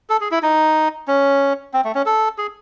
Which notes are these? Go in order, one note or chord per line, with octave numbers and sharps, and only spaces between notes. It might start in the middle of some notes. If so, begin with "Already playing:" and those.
A4
G#4
E4
D#4
C#4
C4
A3
C#4
A4
G#4